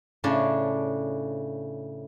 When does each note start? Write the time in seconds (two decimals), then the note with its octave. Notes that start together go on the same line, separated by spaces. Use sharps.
0.24 A2 C#3 D4 A5